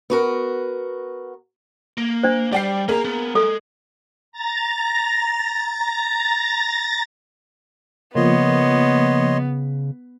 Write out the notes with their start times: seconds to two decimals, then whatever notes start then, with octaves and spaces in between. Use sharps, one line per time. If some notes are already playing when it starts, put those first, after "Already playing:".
0.10 B3 F#4 A#4
1.98 A#3
2.23 D4 C5
2.53 G3 D5 G5 C7
2.89 A#3 B3 G#4 A#4 A#5
3.05 B3
3.35 G#3 A4
4.32 A#5 A6 A#6
8.15 C#3 F3 A#3 B3 C#5 D#5 C6